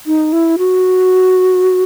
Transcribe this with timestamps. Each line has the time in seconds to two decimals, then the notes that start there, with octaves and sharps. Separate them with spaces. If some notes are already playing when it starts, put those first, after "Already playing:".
0.06 D#4
0.33 E4
0.58 F#4